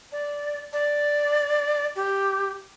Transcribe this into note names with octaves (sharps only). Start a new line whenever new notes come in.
D5
D5
G4